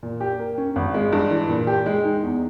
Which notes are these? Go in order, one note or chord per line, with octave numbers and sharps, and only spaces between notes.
A#2
G4
A#3
C#4
G#1
G#3
G2
E3
A#2
G4
G#3
D#4
E2